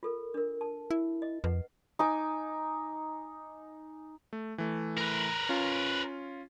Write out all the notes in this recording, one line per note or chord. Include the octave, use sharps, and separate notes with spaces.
F4 A4 A#4
D4 A#4
A5
E4
D#5
F2 B4 F#5
D#4 G#5 D6
A3
E3 A3
A#4 B4
C#4 F4